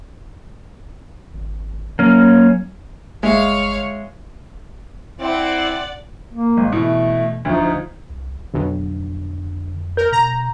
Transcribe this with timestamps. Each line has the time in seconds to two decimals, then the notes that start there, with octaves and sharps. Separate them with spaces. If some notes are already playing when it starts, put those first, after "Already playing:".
1.33 G#1
1.99 F#3 A#3 C#4
3.23 G1 G#3 C#5 E5 F5
5.20 C4 E4 D5 F#5
6.31 A#3
6.57 G#1
6.72 B2 E3 A3
7.45 D2 F3 D#4
8.10 C2
8.54 B1 F2 D3
9.97 A#4 G6
10.12 B2 A#5